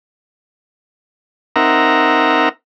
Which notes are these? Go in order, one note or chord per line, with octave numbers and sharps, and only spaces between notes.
C4 D#4 A#4 E5 F#5 A#5